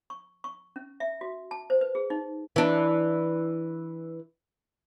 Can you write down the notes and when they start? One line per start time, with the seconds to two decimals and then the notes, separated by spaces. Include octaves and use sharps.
0.10 C#6
0.44 C#6
0.76 C#4
1.00 E5
1.21 F#4
1.51 A5
1.70 C5
1.81 B4
1.95 G#4
2.10 D#4
2.56 E3 D4